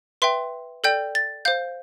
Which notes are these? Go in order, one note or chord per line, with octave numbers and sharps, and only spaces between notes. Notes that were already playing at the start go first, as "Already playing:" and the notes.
B4 E5 G5 C6
A4 D5 G5 G6
A6
C5 F5 G6